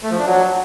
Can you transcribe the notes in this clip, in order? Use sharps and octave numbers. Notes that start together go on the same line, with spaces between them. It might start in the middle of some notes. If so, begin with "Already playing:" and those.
A3
F3
D4
F#3